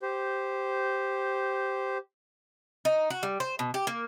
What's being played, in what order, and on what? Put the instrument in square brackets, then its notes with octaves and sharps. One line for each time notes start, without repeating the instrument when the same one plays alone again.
[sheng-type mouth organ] G4 C5
[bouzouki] D#4
F#4
G3
C5
B2
G4
A#3